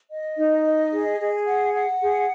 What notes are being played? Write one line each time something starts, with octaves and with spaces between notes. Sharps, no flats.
D#5
D#4
D#5
G#4
G#4
F#5
F#5
G#4